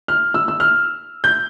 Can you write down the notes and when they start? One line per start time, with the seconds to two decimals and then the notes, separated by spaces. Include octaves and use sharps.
0.08 F6
0.34 E6
0.48 E6
0.60 F6
1.24 G6